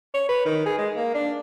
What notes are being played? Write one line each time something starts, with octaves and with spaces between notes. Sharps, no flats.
C#5
B4
D#3
G#4
G#3
A#3
D4